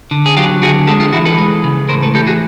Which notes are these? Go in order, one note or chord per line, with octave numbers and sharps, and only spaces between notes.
D3
G#4
F#3 F4 G4
D3 F#4 G#4
G#3 G4 A4
F4 G4
E3 E4 F#4
A4 B4
G#3
C#3
A2 A#4 C5
A4 B4
E3 G4 A4
F#4 G#4